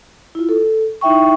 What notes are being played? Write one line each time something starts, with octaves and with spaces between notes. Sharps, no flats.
E4 F4
A4
D#4 E4 E5 G5 C#6